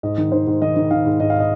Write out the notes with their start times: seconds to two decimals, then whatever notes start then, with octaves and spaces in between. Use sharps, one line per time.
0.03 G#2 D#5
0.18 D#3
0.32 D#3 C5
0.47 G#2
0.62 D#3 D#5
0.76 D#3
0.91 D#3 F5
1.06 G#2
1.20 G#2 D#5
1.30 F5
1.40 D#5